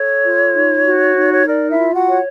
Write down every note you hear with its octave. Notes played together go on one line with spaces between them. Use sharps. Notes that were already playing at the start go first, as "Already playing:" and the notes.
Already playing: A4 C#5
F4
D#4
F#4
D#4
C#5
A#4 D5
E4 E5
F4
F#4 F#5
C#5